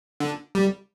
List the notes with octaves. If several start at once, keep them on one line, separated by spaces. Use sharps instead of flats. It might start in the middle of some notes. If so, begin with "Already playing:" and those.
D3
G3